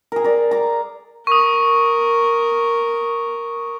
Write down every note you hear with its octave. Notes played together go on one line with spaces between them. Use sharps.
G#4 A#4
A#4 D5
A#5 D6
A#4 C#6 D#6